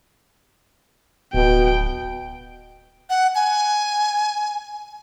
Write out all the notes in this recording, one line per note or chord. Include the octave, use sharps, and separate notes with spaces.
D1 B2 G5
F#5
G#5